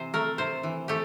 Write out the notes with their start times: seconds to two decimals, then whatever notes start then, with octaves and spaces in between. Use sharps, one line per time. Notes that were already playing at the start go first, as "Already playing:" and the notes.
Already playing: C3 E3 C5
0.14 A3 A#4
0.38 C3 C5
0.63 E3
0.88 A3 G4